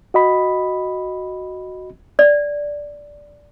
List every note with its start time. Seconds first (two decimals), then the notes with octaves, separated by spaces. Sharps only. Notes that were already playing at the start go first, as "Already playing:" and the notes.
0.14 F#4 D#5 B5
2.19 D5